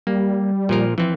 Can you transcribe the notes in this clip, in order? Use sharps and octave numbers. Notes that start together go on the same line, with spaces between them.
G3 A#3
A#2 F3 A#4
E3 F3 C4